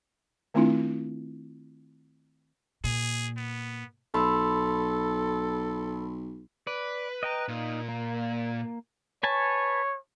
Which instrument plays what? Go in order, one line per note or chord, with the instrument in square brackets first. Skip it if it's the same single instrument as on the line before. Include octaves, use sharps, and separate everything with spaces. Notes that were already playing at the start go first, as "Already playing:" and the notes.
[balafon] D#3 A3 C4 D4 E4 F4
[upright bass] A#2 [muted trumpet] G#4
[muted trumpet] B3
[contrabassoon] B1 [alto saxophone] A4 [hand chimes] B5 C6 E6
[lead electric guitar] B4 [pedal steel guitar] D5
[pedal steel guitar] D#5 G5 A#5
[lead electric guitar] A#2 [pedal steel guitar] D#4
[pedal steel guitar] A#3
[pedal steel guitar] B4 G#5 A5 [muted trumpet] C#5